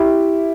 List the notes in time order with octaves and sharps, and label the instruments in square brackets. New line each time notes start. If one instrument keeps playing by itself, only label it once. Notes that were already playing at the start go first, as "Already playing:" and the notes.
Already playing: [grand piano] E4 G4